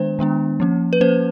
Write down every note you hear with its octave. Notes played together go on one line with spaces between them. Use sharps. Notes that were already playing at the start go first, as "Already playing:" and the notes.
Already playing: D#3 G#3 B3 D4 C5
D#3 G#3 B3 D4
F3 A#3 C#4
B4
F3 A#3 C#4 C5